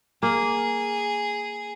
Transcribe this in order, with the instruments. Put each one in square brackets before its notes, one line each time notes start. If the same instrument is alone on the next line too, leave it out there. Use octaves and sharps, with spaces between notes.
[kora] A#3 [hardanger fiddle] G#4